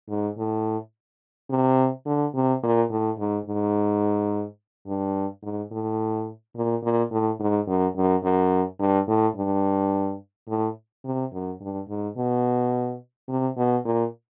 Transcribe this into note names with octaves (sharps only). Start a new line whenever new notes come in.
G#2
A2
C3
D3
C3
A#2
A2
G#2
G#2
G2
G#2
A2
A#2
A#2
A2
G#2
F#2
F#2
F#2
G2
A2
G2
A2
C3
F#2
G2
G#2
B2
C3
B2
A#2